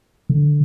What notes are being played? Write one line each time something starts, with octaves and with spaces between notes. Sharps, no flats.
D3